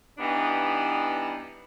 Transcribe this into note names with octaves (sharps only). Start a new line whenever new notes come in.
E3 G3 B3 D4 D#4